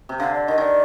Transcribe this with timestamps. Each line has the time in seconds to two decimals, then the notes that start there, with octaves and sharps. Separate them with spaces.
0.09 C3
0.19 D3 F5
0.34 D5
0.47 D#3 D#5
0.58 D#3 D5